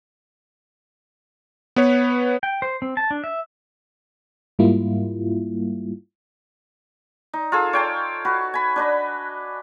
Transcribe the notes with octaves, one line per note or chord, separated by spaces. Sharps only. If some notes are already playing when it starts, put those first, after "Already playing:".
B3 B4 C#5
G5
C5
C4
A5
D4
E5
G#2 G3 A#3 E4 F4
D#4
F4 G#4 A4
C#5 G5 A5
F#4 B4
G#5 B5
D4 B4 D#5